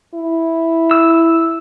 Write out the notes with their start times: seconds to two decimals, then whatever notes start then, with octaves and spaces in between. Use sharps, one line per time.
0.14 E4
0.91 E6